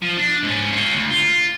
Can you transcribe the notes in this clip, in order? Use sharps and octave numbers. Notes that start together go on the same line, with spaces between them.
F3
D4
G#2 C#4
F4 C#5
D2
F4